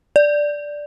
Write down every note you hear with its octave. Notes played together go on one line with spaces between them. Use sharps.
D5